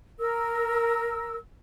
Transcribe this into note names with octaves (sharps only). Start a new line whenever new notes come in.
A#4 E6